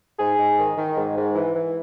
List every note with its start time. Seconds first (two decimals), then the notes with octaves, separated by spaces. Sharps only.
0.18 G#2 G#4
0.37 G#2
0.57 D#3
0.77 D#3
0.96 G#2
1.15 G#2
1.35 E3
1.54 E3